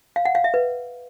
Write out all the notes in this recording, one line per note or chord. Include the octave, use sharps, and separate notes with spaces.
F5
F#5
F5
E5
B4